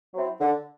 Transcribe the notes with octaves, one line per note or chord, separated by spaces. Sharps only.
F#3 C4 E4
D3